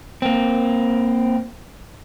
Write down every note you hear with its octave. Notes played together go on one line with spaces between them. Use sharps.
A#3 C4